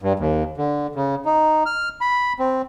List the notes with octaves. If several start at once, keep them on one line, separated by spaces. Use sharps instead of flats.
G2
D#2
D3
C#3
D#4
F6
B5
C4